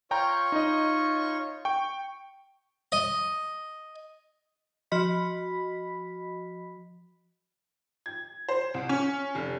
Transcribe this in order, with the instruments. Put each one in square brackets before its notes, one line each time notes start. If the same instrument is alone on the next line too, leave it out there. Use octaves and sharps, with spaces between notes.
[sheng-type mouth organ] F4 C#5 C#6 [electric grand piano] G5 A#5 G6
[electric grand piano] D#4 D#5
G5 C#6
[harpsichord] D#5
[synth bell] F3 F#4 D#5 B5 B6
[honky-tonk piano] G#6
C5
C2
C#4
F1